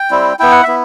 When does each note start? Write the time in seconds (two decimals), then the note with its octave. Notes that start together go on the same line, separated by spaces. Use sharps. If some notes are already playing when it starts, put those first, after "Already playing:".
Already playing: G5
0.10 G3 C4 E4
0.39 B3 E4 G5
0.52 F#5
0.63 B3 E4 E5